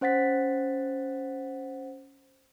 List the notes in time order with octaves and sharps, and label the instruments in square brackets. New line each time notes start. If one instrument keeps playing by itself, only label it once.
[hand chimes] C#4 C5 F#5 A6 B6